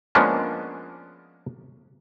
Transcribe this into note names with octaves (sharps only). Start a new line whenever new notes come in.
F3 G#3 A#3 B3 C#4 D4